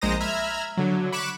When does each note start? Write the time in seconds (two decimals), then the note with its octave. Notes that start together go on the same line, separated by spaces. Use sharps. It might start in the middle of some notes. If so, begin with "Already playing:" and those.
0.02 A#1 G#3 C5 A#5 D#6 A#6
0.20 E5 A#5 B5 F6 G#6
0.77 D3 F#3
1.12 B5 C#6 D6 F#6 E7